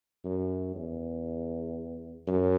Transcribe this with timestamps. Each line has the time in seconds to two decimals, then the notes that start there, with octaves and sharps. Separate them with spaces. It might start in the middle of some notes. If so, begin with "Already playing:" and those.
0.25 F#2
0.75 E2
2.27 F#2